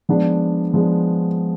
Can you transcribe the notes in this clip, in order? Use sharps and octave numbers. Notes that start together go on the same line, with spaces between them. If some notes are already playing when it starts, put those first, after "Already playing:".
F3 G#3 B3 D4
F3 G#3 B3 D4